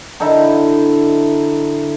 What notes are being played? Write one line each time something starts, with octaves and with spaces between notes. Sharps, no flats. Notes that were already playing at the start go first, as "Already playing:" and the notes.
D3 D#4 E4 A4